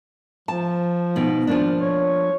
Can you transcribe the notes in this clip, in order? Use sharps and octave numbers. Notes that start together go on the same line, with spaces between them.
F3 A5
B2 D#3
F3 A#3 D4
C#5